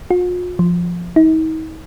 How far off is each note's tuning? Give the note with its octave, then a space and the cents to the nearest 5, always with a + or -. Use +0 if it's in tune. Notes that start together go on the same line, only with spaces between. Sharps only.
F4 +45
F3 +0
D#4 +40